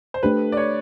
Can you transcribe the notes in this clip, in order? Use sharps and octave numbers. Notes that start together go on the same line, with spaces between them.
C5
A3 D4 G4 B4
D5
C#5